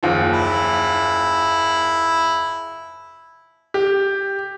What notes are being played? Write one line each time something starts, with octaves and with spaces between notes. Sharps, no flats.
F#1 D#2 F3
E4
G4